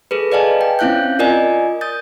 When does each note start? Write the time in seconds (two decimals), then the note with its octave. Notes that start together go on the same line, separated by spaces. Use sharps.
0.11 G#4 A4 B4
0.32 B4 D5 D#5 F5 G#5 A5
0.61 G5
0.79 C4 C#4 E4 F5 F#6 G6
1.19 F4 A#4 D5 D#5 G#5
1.81 D#6 G6 A6